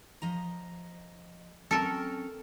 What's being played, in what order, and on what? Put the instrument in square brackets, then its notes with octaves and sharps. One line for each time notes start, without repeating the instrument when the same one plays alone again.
[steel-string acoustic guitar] F3 D#5 A#5
[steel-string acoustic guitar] F#3 C4 C#4 [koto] A4 A#4